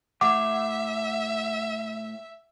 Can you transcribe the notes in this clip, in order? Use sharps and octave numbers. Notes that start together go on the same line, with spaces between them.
A2 E5 F#5 D6